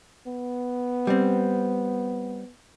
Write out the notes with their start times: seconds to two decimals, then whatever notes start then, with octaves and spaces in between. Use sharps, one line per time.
0.27 B3
1.07 G3 C4